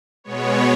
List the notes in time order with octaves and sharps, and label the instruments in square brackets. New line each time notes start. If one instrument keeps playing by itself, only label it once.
[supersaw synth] B2 G#3 B3 C#5